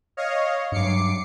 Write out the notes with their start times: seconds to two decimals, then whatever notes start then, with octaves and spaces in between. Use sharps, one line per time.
0.17 C#5 D#5 F5
0.72 G2 F#3 D6 C7 C#7